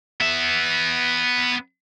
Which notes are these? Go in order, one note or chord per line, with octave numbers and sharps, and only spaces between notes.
B3 E5